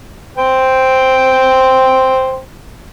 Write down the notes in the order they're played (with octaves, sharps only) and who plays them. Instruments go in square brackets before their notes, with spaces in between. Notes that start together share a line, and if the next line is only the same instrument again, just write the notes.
[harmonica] C5 G5